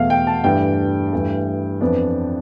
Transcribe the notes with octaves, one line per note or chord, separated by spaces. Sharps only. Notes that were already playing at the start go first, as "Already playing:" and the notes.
Already playing: E2 B2 A3 F5
G5
A5
G2 E3 A3 D4 G5
G2 E3 A3
F2 E3 B3 D4